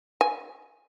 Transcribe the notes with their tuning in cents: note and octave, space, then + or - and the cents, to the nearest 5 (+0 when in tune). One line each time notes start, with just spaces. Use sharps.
G#5 +5